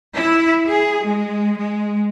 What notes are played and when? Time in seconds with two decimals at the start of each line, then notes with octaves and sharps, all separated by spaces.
0.15 E4
0.68 G#4
1.04 G#3
1.57 G#3